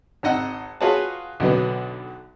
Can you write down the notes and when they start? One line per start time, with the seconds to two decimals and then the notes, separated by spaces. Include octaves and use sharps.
0.23 G#1 D#4 D#5 F#5 E6
0.81 F4 F#4 G#4 B4 C#5 A5
1.40 B1 D3 F#3 B3